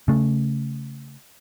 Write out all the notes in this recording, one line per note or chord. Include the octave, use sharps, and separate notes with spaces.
C#3 A3